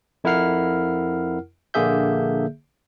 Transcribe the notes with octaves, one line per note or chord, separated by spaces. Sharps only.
F2 E4 A#4 F#5 F6 C7
A#1 D3 A#3 G#4 E5 G6